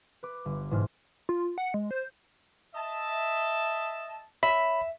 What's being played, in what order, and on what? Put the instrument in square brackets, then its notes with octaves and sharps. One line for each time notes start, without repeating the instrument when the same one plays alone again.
[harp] B4 D6
G1
E1 G#2 F6
[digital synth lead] F4
F#5
G#3
C5
[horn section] D#5 E5 A5
[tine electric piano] C#5 B5 [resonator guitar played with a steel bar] E5